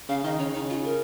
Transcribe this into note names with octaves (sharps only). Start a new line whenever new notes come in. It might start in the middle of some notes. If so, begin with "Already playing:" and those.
C#3 F5
D#3 D#5
C#3 C#5
D#4
F4
A#4